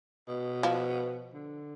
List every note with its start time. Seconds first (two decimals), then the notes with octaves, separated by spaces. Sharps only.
0.28 B2
0.63 F3
1.33 D3